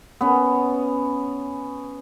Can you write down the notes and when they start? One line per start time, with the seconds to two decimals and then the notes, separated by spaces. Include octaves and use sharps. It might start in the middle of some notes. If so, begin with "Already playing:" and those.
0.21 B3 C#4